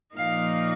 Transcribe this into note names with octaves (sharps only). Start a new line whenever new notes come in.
A#2 F3 A#3 D#4 F5